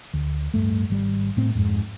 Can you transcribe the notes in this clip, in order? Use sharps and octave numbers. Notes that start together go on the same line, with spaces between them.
D2
D1 G2 A3
G#1 G3
A2 C4
F2 G#2